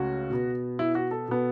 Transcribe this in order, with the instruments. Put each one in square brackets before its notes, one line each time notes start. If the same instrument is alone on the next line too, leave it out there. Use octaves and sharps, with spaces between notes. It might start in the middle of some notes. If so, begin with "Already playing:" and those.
Already playing: [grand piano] C#2 C#3 A3 C#4 F#4
B2 B3
E4
F#4
A4
B2 B3